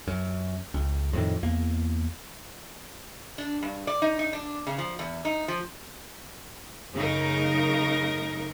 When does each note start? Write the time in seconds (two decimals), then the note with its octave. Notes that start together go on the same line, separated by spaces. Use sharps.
0.08 F#2
0.74 C#2
1.13 F2 A2 D#3
1.43 E2 A#3
3.38 D4
3.63 G2
3.87 D5
4.02 D#4
4.19 D#4
4.33 D4
4.67 C#3
4.78 F3
4.99 E2
5.25 D#4
5.48 F3
6.93 F#2 C#3 A3 D#4 A#4